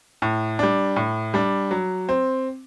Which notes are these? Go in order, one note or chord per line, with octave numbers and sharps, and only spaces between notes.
A2
G3 D4
A2
G3 D4
F#3
C4